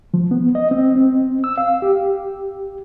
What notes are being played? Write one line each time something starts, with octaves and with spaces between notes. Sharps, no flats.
F3
B3
D#5
C4
C4
E6
F5
G4